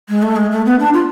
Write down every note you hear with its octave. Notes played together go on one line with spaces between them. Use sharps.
G#3
A3
G#3
A3
B3
D4
F4